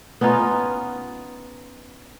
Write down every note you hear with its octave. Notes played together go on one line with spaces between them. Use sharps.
B3 C#4 D#4 F4